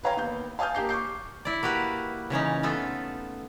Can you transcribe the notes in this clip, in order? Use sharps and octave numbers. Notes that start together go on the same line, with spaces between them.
B4 C#5 F5 G5 A#5
D#2 B3 G6
F5 G#5 A5 D#6 F6 G6
A#3 G4 G6 C7
C#6 D6 G6 C7
E4 D5
A#3 F#4 G4 B4
C#3 E3 C#4 D#4
A3 B3 F4 A4